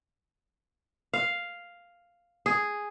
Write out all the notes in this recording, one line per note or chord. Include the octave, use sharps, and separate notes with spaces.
F5
G#4